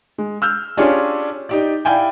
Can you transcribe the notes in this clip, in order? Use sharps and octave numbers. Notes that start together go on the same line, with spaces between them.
G#3
E6 F6 G6
C#4 D4 F4 G4 G#4 C#5
D#4 G4 D5
E4 D5 F5 G5 G#5